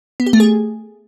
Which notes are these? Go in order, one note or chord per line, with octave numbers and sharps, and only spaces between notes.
B3
G4
A3
G#4